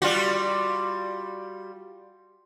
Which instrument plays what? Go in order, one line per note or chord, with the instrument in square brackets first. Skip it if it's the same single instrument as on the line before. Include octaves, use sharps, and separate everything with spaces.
[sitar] G3 F4 F#4